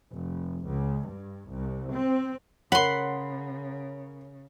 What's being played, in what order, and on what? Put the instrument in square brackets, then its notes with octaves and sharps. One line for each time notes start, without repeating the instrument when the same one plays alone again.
[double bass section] F1
C#2
G2
C2
C4
[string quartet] C#3 [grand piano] A#4 C#5 [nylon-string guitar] F#5 [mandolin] B5 C6